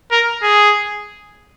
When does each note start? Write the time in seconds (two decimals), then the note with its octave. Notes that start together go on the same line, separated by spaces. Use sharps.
0.11 A#4
0.43 G#4